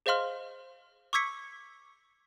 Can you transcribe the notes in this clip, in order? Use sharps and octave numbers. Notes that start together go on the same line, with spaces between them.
G#4 C5 D#5 F5 C6 F6
C#6 D6 E6 G#6 B6 C#7